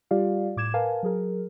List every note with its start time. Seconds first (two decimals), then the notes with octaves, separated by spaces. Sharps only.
0.11 G3 F4 G4 D5 F5
0.57 A2 D6 G#6 E7
0.74 A#4 B4 F5 G#5 A5
1.03 F#3 G#4 A#4